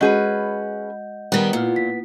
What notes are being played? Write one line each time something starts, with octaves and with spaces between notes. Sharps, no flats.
G#3 C#4 F#4 G#4 B4 D#5 F#5 G6
D#3 G3 B3
A#2 A#3 E4 F4
B6